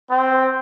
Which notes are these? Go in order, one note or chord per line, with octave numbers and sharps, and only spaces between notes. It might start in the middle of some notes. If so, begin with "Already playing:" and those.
C4